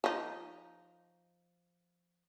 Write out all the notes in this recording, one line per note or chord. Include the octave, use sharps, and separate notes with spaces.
F3 D#4